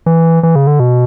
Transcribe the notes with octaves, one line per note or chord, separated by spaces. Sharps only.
E3
E3
C#3
D3
B2